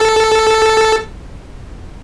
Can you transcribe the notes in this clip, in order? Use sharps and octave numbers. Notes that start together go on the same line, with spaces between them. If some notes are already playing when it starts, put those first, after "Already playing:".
Already playing: A4